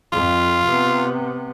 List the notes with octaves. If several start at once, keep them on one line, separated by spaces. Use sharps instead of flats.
F2 F4
C3 B3